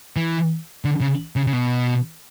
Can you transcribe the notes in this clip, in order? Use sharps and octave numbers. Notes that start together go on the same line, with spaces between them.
E3
D3
C#3
C#3
C#3
B2